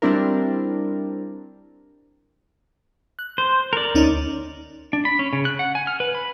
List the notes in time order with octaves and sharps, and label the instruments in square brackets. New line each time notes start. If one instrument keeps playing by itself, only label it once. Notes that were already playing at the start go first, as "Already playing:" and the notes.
[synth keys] G3 C4 D4 E4 A#4
[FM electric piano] F#6
[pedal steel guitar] C5
A#4 D5
[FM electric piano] D2 C#4 D#4
[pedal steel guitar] D4
B5
C#4
C#3
F#6
F#5
G#5
F6
B4
B5